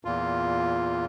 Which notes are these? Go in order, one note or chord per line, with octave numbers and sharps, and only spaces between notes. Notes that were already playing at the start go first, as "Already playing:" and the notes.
E2 A#2 F4